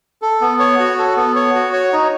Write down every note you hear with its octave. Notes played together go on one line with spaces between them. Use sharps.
A4
B3
C#5
F#4
A4
B3
C#5
F#4
C#5
D#4